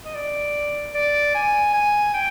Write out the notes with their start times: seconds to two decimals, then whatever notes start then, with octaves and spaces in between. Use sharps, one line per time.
0.05 D#5
0.15 D5
0.95 D5
1.35 G#5
1.74 G#5
2.14 G5